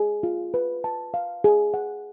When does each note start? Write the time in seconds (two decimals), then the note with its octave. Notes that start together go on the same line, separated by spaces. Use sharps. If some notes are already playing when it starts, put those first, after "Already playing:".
Already playing: G#4
0.23 F4
0.54 B4
0.84 A5
1.14 F5
1.44 G#4
1.74 F#5